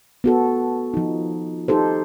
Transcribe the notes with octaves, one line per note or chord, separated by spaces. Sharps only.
B3 F#4 A4
F3 D#4
D#4 G4 A4 C5